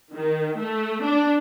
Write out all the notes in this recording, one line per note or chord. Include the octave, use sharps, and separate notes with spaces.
D#3
A3
D4